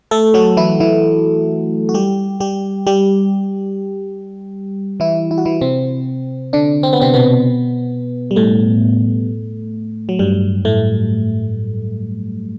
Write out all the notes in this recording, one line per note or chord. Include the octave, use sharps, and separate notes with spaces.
A3 A4
F#3 F#4
E3 E4
E3 E4
F#4
G3 G4
G3 G4
G3 G4
E3 E4
E4
F#4
E3 E4
C3 C4
D3 D4
C4
B3
C3 C4
B2 B3
G3
A2 A3
F#3
G2 G3
A2 A3